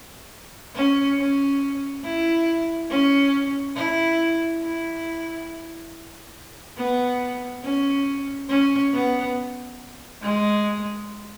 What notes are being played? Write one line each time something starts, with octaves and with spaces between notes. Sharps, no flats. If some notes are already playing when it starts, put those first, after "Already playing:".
C#4
C#4
E4
C#4
E4
E4
B3
C#4
C#4
B3
G#3